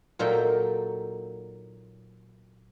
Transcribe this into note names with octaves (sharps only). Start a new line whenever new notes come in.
A#2 F#3 A#3 D#4 A4 G5